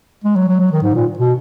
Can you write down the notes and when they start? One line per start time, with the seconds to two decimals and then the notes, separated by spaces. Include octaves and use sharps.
0.24 G#3
0.36 F#3
0.48 F#3
0.60 F#3
0.72 D#3
0.83 G#2
0.95 A#2
1.19 B2